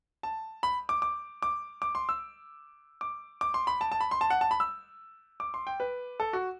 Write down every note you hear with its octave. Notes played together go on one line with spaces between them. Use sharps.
A5
B5
D6
D6
D6
D6
C6
E6
D6
D6
C6
B5
A5
A5
B5
C6
A5
F#5
A5
B5
E6
D6
C6
G5
B4
A4
F#4